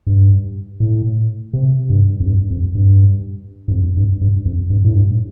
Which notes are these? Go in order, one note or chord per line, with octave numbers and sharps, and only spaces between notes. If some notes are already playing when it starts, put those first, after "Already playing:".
G2
A2
C3
G2
F2
G2
F2
G2
G2
F2
G2
G2
F2
G2
A2
G2